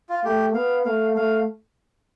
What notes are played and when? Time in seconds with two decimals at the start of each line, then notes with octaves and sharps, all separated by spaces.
0.09 F4
0.25 A3 G4
0.55 B3 F5
0.85 A3 F5
1.16 A3 F5